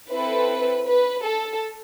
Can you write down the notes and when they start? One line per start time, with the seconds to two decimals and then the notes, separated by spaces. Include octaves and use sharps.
0.11 C4 E4 A4 B4
0.86 B4
1.24 A4